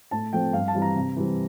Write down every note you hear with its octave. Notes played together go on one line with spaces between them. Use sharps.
A2 A5
F3 A3 C4 G5
G2 F5
A5
E3 G3 C4
A#5
C3
E3 G3 C4